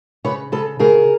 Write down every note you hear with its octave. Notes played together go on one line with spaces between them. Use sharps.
C#3 B4 C#5
C#3 A4 B4
C#3 G#4 A#4